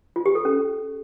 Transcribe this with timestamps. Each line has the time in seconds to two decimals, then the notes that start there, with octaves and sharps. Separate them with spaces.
0.16 F4
0.26 G4
0.35 A4
0.45 C#4